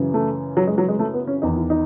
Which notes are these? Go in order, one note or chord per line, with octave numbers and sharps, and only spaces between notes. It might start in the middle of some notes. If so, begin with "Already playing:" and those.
Already playing: F#2 C#3 E3
A3
F#3
G#3
F#3
G#3
A3
B3
C#4
E2 D#3 D#4
E4
D#4